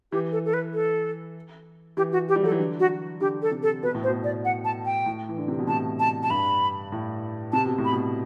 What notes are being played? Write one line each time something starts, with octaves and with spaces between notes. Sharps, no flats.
E3 G4
A4
A4
B4
A4
E3 G4
F#4
G4
G3
F#3 A4
E3
D3
F#4
D3 G4
A4
C3
A4
B2 B4
A2
C5
B2
D5
F#5
A5
G5
A2
E3
D3
C3
B2
A2 A5
A5
A5
G2 B5
A2
C3 A5
B2
A2
B5
B2